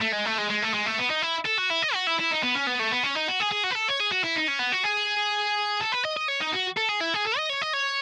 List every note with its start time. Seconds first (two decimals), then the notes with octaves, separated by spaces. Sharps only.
0.02 A3
0.13 G#3
0.26 A3
0.38 G#3
0.50 G#3
0.62 A3
0.74 G#3
0.86 A3
0.98 B3
1.10 D#4
1.22 E4
1.46 A4
1.58 F#4
1.71 E4
1.82 D#5
1.94 F#4
2.07 E4
2.19 E4
2.31 D#4
2.43 B3
2.55 C#4
2.67 B3
2.79 A3
2.92 B3
3.03 C#4
3.15 D#4
3.28 F#4
3.40 G#4
3.51 G#4
3.63 F#4
3.70 B4
3.75 A4
3.88 C#5
4.00 G#4
4.12 F#4
4.24 E4
4.36 D#4
4.48 C#4
4.59 B3
4.72 F#4
4.84 G#4
5.81 A4
5.92 B4
6.05 D#5
6.17 D#5
6.28 C#5
6.41 D#4
6.53 F#4
6.77 A4
6.89 G#4
7.01 E4
7.14 G#4
7.25 A4
7.37 D#5
7.49 C#5
7.62 D#5
7.73 C#5